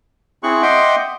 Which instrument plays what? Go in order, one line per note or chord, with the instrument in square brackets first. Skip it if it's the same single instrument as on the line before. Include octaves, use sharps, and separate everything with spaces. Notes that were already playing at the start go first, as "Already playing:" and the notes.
[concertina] C4 E4 G#4 C#6 F#6
D#5 E5 F#5 G5 C6 D6